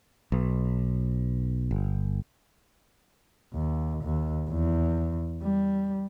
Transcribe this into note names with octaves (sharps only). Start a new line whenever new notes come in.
B1
G1
D#2
D#2
E2
G3